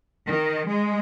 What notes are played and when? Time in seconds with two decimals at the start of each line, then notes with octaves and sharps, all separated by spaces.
0.27 D#3
0.67 G#3